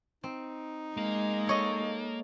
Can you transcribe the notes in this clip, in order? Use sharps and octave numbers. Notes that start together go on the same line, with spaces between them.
C4 D#4
G#3 A#3
A4 C#5 D#5